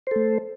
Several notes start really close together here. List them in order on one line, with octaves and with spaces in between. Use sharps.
C5 A4 A3